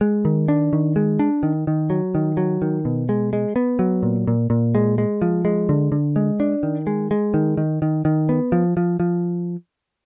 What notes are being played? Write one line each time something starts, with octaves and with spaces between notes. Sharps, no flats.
G#3
D#3
D4
D#3
G#3
D4
D#3
D#3
F#3
D#3
F#3
D#3
B2
G#3
G#3
B3
F#3
A#2
A#2
A#2
G#3
G#3
F3
G#3
D3
D3
G#3
D4
D#3
G#3
G#3
D#3
D#3
D#3
D#3
B3
F3
F3
F3